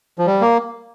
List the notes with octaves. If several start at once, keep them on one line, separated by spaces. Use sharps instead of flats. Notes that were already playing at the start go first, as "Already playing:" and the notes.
F3
G3
A#3